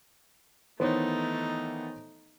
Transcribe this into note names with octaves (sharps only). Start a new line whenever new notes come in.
D#3 E3 A3 B3 D#4 C5 C#5